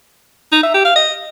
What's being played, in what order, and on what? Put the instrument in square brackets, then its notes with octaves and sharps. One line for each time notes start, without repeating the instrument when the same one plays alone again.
[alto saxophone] D#4
E5
G4
F5
D#5